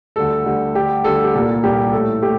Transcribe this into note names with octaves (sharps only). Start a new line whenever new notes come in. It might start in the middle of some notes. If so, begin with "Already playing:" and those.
D2 D3 G3 A4
D2 D3 G3
D2 D3 G3 G4
D2 D3 G3 A4
G4
C2 A#2 G3 A#3 A4
C2 A#2 G3 A#3 G4
A2 A3 A4
A3 G4